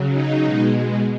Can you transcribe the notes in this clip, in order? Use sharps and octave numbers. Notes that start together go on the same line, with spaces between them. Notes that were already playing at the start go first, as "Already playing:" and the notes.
Already playing: C#3 F#3
D#4
B2 G#3